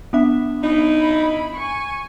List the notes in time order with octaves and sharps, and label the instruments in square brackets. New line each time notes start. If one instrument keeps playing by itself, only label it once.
[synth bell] B3 D4 E5
[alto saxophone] D#4 [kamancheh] E4 B5
[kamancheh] G#5 C#6